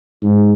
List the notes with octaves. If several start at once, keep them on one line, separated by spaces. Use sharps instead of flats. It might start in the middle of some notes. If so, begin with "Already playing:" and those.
G#2